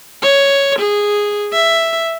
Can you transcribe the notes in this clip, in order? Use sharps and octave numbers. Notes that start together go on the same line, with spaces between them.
C#5
G#4
E5